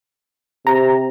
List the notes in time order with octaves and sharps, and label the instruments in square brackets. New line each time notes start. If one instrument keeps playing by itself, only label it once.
[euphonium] C3 [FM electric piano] A#5